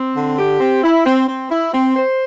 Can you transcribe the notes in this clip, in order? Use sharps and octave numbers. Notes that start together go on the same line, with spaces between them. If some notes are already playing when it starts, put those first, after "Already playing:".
Already playing: C4
D3
G4
C4
E4
C4
C4
E4
C4
C5